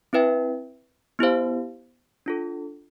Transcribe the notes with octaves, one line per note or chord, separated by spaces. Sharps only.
C4 E4 B4 E5 G5
B3 E4 G4 C5 F5
D4 F4 A4